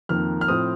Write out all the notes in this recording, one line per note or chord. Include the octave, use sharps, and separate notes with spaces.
F2 D#3 A#3 F6
F6
A2 F3 C4 D#6